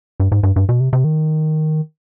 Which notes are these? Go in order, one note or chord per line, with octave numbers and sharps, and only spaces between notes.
G2
G#2
G2
G2
B2
C3
C3
D#3